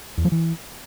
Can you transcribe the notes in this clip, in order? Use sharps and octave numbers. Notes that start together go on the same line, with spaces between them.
E2
F3
E3